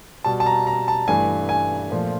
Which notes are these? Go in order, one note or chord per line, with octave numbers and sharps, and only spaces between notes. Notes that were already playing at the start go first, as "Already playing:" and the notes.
B2 G3 A5
A5
A#5
A#5
A5
G2 E3 A3 G#5
G#5
A#2 F3 A3